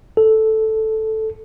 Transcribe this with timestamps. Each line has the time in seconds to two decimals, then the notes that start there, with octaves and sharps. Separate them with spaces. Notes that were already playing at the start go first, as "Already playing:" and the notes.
0.17 A4